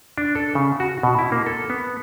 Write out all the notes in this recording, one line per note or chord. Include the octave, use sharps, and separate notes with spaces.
D4
A4
C#3
F#4
B2
E4
A#3
A4
B3